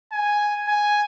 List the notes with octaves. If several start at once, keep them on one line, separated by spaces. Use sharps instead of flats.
G#5
G#5